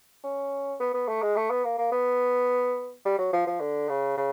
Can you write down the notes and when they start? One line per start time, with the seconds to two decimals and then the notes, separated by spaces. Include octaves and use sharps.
0.24 C#4
0.80 B3
0.94 B3
1.08 A3
1.22 G#3
1.37 A3
1.50 B3
1.65 A#3
1.78 A#3
1.92 B3
3.06 G3
3.19 F#3
3.33 F3
3.47 F3
3.61 D3
3.89 C#3
4.17 C#3